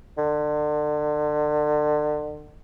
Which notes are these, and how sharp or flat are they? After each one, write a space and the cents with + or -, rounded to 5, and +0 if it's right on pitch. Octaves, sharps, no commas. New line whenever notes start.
D3 +35